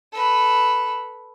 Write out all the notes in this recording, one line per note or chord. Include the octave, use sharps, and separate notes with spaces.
A4 B4